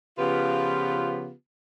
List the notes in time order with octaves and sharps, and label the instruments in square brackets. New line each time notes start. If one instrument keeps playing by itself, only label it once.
[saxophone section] C#3 F3 B3 F4 G4 B4